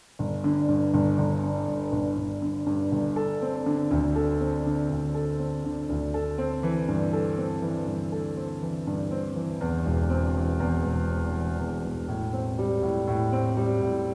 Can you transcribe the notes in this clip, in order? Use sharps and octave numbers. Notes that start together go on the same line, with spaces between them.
G1
D3
G2
G1
G1
D3
G2
G1
G1
D3
G2
G1
A4
C4
D3
D2
A4
C4
D3
D2
A4
C4
D3
D2
A4
C4
E3
G2
A4
C4
E3
G2
A4
C4
E3
G2
C4
E3
E2
E1
C4
E3
E2
E1
C4
E3
E2
E1
A2
C4
G3
A2
A2
C4
G3
A2